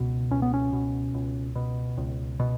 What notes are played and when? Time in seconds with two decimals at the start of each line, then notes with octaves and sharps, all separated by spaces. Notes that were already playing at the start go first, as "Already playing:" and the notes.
Already playing: C#2 B2
0.31 C#2 C#4
0.42 B3
0.54 C#4
0.73 B2
1.14 C#2
1.56 B2
1.98 C#2
2.40 B2